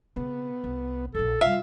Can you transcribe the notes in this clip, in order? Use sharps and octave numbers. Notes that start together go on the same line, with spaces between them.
C#3 B3 C4
C2
E1 A#1 A4
C3 G3 F4 E5 F5